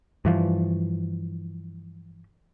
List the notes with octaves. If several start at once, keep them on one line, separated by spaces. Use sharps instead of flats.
G2 E3 F3